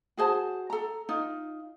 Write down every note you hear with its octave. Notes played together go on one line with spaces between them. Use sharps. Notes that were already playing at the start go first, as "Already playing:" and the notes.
F#4 G#4 C5 A5
A4 A#5
D#4 F4